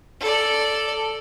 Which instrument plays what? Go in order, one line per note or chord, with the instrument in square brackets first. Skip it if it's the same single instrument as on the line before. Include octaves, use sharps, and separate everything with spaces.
[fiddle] A4 D5